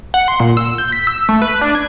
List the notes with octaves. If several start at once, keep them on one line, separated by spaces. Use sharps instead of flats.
F#5
C6
A#2
E6
G6
B6
E6
A3
B4
D4
G#6